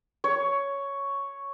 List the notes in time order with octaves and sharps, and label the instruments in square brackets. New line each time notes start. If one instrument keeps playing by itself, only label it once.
[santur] C#5